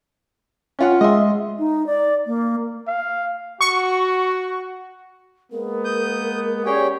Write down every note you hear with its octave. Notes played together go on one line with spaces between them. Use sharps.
C#4 F4 F#5
G#3 D#5 E5 C6
D#4
D5
A#3
F5
F#4 C#6
G#3 A#3 B3 A#4
D#6 G6
C#4 G4 G#4 A#4 C#5 D5 G5